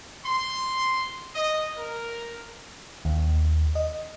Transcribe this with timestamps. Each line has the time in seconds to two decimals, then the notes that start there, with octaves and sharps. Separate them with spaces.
0.26 C6
1.34 D#5
1.77 A#4
3.05 D#2
3.75 D#5